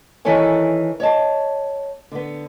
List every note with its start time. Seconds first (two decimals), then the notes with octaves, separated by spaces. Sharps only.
0.25 D#3 E3 E4 A4 C#5 G#5
1.00 C#5 D#5 A5
2.12 D3 B3